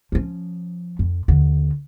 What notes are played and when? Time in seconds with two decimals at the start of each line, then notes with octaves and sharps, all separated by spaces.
0.12 F3 C#4
0.99 F2
1.28 D#2 D3